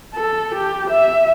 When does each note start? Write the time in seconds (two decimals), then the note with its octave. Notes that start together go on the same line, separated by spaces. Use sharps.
0.14 A4
0.54 G4
0.90 E5